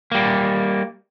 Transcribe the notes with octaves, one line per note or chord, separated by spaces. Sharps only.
G3 A#3